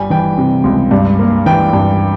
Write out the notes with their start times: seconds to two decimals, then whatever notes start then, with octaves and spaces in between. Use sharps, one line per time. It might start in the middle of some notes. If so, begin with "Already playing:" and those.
Already playing: G1 G3 G#5
0.10 E3 G5
0.38 C3
0.64 C#2
0.91 G2
1.19 A#3
1.46 E3 G5
1.73 G2